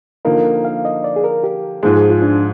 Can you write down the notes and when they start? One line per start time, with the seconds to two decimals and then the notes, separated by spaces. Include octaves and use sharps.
0.25 D3 F3 A#3 D#4 A#4
0.65 F5
0.85 D#5
1.04 D5
1.16 G#4
1.24 A#4
1.44 G4
1.83 G#2 F3 G#3 G#4
1.96 G#4
2.10 F4
2.22 D4